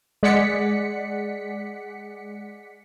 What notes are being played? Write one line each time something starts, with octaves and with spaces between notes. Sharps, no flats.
G#3 D5 F#5 B6 C#7